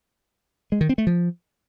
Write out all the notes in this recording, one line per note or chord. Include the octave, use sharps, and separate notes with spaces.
G#3
D#3
C4
A3
F3